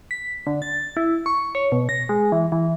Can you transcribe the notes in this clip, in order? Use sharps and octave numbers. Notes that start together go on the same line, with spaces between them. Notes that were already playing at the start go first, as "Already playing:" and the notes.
B6
D3
A6
E4
C#6
C#5
B2
A#6
G#3
E3
E3